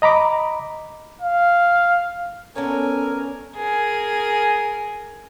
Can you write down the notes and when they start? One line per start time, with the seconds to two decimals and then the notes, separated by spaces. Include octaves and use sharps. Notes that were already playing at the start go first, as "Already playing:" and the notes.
0.02 D#5 A#5 B5 D6
1.21 F5
2.55 B3 C#4 D4 A4 A#4 C#5 G#5
3.56 G#4 A#4